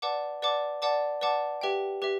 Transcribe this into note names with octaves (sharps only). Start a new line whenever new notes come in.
B4 D5 F#5 A5 D6
B4 D5 F#5 A5 D6
B4 D5 F#5 A5 D6
B4 D5 F#5 A5 D6
G4 B4 E5 G5
G4 B4 E5